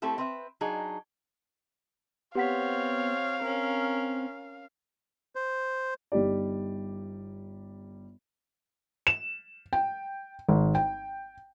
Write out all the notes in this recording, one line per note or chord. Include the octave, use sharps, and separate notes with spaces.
A3 C4 E4 G4 A4
C4 B4 E5
F#3 D4 D#4 G#4
B3 C4 G4 C#5 F5 F#5 B6
C4 C#4 A#4
C5
G1 G3 D#4 G4 D5
E7
G5
G#1
G5